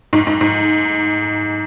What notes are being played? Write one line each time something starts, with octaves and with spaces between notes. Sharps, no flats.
G#2
G#2
G#2